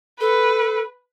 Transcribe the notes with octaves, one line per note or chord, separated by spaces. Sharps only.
A4 B4